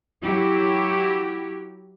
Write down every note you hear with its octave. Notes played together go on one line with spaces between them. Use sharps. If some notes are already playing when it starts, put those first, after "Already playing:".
F#3 E4 F#4 G4